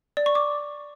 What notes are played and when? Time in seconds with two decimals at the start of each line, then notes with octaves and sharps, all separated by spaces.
0.17 D5
0.26 C#6
0.35 D6